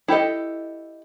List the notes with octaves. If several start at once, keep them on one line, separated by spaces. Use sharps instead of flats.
E4 G4 A4 D#5